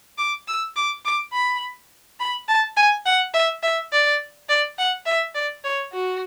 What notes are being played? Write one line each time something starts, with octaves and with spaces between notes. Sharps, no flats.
D6
E6
D6
D6
B5
B5
A5
G#5
F#5
E5
E5
D5
D5
F#5
E5
D5
C#5
F#4